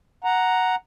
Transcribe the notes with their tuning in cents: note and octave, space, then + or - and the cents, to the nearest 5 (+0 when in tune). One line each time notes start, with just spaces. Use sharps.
F#5 +0 A#5 +0